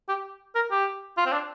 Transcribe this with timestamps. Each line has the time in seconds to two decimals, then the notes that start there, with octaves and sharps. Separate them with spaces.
0.09 G4
0.55 A#4
0.71 G4
1.17 F4
1.26 C4
1.32 D4